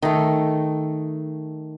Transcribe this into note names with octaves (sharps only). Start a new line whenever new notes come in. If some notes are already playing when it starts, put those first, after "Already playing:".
D#3 A3